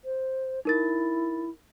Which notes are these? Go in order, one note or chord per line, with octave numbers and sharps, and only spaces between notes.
C5
D#4 E4 A#4 A6